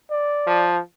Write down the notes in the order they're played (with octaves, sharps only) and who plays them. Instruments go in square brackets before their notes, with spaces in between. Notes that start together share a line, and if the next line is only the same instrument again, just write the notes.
[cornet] D5
[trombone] F3